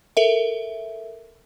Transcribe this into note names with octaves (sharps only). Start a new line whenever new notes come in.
A4 A#4 E5